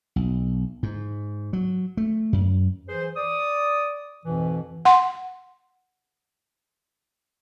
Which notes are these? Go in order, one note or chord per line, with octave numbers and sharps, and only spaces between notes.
B1
G#2
F#3
A3
F#2
E3 G#4 B4 C5
D5 D#6
F2 G#2 B2 E3
F#5 C6